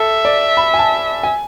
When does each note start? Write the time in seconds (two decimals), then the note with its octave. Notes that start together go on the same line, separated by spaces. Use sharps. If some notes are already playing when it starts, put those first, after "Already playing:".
Already playing: A4 E5
0.25 D5
0.57 B5
0.74 G#5
0.79 A5
1.23 G#5